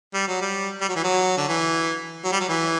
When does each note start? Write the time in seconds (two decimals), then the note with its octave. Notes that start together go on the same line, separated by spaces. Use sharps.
0.14 G3
0.28 F#3
0.41 G3
0.81 G3
0.89 F#3
0.96 E3
1.04 F#3
1.37 D3
1.48 E3
2.24 F#3
2.32 G3
2.40 F#3
2.49 E3